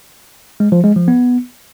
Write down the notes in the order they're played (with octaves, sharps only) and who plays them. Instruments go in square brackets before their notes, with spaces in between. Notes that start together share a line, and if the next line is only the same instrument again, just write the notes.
[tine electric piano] G#3
F3
G#3
F3
B3